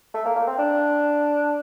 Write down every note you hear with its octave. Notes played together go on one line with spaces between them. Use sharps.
A3
A#3
A#3
C4
D4